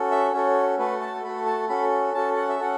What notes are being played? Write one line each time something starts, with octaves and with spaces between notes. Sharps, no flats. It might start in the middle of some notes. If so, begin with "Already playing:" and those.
Already playing: C#4 F#4 A4
E5
C#4 F#4 A4 C#5
A3 F#4 A4 B4
A5
A3 F#4 A4 B5
A5
C#4 F#4 A4 B5
C#4 F#4 A4 A5
F#5
E5
C#4 F#4 A4 F#5